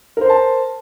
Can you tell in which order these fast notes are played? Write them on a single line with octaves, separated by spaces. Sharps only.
A#4 C5 C6 A5